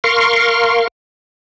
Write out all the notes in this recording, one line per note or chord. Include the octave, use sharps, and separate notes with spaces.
A#4 F5 C6 C#6